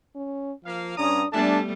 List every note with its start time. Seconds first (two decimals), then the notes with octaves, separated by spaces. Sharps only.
0.15 C#4
0.65 F3 A#3 F5
0.98 G2 C#4 D4 A#5 D#6
1.33 G3 A3 B3 D4 A4 E5 G#5 A5